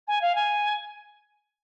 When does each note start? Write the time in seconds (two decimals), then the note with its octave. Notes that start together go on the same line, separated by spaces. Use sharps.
0.07 G#5
0.21 F5
0.35 G#5